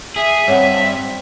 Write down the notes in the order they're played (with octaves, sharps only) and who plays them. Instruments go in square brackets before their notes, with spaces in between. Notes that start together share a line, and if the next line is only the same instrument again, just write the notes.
[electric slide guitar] G#4 [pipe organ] E5
[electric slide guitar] G2 [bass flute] C4 [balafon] C#5 F#5